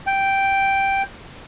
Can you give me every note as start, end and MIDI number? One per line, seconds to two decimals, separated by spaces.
0.07 1.02 79